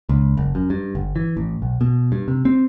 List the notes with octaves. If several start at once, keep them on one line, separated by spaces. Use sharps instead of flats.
C#2
F#1
F#2
G2
G1
E3
A1
B1
B2
G2
C3
C4